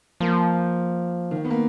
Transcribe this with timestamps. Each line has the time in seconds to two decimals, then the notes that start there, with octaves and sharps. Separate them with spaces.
0.20 F3 A#3
1.31 D#3
1.45 B3
1.50 A#3